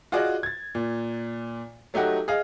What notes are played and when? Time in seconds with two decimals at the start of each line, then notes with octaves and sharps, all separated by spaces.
0.12 F4 F#4 G#4 D5 D#5
0.43 G#6 A6
0.75 A#2
1.94 F#3 A3 D#4 G4 F#5
2.28 G#4 D#5 F5